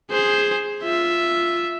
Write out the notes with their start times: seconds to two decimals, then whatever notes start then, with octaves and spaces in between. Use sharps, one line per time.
0.10 G#4 C5
0.82 F4 E5